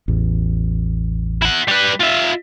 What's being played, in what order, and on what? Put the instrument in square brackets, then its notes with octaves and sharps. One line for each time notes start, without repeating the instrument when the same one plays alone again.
[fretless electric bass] A1 E2
[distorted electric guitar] E4 F#5
G3 B4
F4 E5